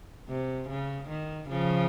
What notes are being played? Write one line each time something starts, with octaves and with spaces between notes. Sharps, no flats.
C3
C#3
D#3
C#3 F3